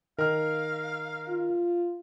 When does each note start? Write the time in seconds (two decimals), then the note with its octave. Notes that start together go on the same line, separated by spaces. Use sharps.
0.19 D#3 A#4 F5 F6
1.28 F4